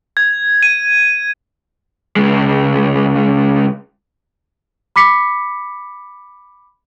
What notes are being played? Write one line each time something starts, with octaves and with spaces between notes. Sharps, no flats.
G#6
D#7
C#2 G#3
B5 D6 B6 C#7